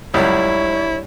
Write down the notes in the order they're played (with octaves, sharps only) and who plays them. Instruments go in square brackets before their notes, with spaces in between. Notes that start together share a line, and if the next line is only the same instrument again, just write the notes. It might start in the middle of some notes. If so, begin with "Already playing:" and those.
[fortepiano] C#2 F#2 [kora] G3 D4 [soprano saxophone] E4 [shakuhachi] C#5